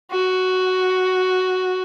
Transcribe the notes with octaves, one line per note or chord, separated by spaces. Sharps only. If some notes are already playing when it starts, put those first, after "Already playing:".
F#4